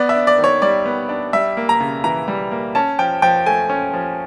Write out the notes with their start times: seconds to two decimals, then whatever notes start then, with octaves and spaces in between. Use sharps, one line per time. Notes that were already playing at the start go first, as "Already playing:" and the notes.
Already playing: B3 D5
0.09 E5
0.15 D4
0.27 D5
0.38 D#3
0.44 C#5
0.62 G3 D5
0.85 B3
1.09 D4
1.33 G3 E5
1.57 A#3
1.69 A#5
1.80 C#3
2.04 E3 A#5
2.28 G3
2.51 A#3
2.75 C#4 A5
2.99 F3 G5
3.22 F3 G5
3.46 A3 G#5
3.70 C#4
3.94 F3